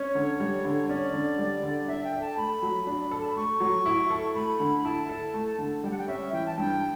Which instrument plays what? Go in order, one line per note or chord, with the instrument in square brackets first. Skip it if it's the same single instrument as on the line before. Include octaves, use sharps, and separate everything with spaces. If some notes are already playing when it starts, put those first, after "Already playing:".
Already playing: [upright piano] C#4 [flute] C#5
[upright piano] D3
G3
D3
[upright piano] C#4 [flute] D5
[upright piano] D3
G3
D3
[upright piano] D4 [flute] E5
[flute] G5
[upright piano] A4
[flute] A5
[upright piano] A3 [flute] B5
[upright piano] F#3
D4
A4
[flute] A5
B5
[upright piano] A3 [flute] C#6
[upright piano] F#3
E4
A4
[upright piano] A3 [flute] B5
[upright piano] D3
[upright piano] E4 [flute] A5
[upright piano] A4
A3
D3
[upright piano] G3 [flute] G5
[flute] F#5
G5
[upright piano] C#4 [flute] E5
[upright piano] E3 [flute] G5
[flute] A5
[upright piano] G2 [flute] G5